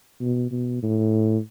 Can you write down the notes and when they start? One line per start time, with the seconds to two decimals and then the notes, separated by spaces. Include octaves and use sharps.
0.20 B2
0.51 B2
0.82 A2